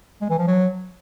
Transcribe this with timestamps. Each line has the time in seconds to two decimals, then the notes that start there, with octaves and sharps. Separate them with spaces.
0.21 G#3
0.30 E3
0.38 F3
0.47 F#3